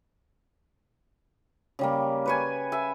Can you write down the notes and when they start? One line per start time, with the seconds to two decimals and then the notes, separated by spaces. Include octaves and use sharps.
1.79 C#3 G3 A#3
2.26 B4 C#5 G#5
2.72 E5 G#5